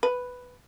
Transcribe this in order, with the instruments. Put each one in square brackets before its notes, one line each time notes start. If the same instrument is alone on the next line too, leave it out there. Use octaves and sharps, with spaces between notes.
[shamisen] B4